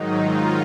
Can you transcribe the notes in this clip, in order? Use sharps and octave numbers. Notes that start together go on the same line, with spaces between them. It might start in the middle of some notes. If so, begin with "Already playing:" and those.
Already playing: G#2 D#3 F#3 D#4
F4